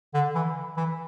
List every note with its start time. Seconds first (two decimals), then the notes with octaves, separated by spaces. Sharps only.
0.14 D3
0.35 E3
0.77 E3